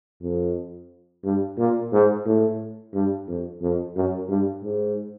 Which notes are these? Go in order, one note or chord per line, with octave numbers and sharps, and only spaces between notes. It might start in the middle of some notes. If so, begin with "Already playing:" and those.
F2
G2
A#2
G#2
A2
G2
F2
F2
F#2
G2
G#2